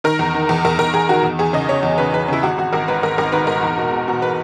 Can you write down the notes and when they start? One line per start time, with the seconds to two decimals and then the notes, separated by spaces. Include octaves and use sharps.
0.04 D#3 A#4
0.19 E2
0.34 D#3
0.49 E2
0.65 E2 A#4
0.79 E2 A#4
0.94 E2 G#4
1.09 D#3 F#4
1.23 E2
1.39 E2 G#4
1.53 C#3 D#5
1.69 C#3 C#5
1.83 E2
1.98 C#3 B4
2.13 E2 B4
2.28 C#3 E4
2.43 G#1 F#4
2.58 G#1 F#4
2.73 G#1 A#4
2.88 G#2 B4
3.03 G#1 A#4
3.18 G#1 A#4
3.32 D#3 B4
3.47 G#2 A#4
3.63 E2
3.77 B2
3.92 B2
4.08 B2
4.22 B2 B4